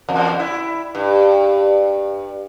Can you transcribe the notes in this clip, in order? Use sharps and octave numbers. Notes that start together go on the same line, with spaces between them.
E2
E4
G2